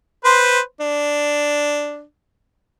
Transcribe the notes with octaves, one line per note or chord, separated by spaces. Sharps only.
B4 C5 C6
D4